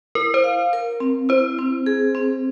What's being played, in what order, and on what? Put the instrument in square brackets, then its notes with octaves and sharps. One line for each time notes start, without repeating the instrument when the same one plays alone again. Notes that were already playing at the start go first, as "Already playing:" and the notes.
[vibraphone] E4 [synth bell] A#4
[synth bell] C5
[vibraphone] F5
A#4
C4
[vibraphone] E4 [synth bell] C5
[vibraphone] C4
G#4
C4